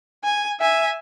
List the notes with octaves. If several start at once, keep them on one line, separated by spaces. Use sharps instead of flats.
G#5
E5 G#5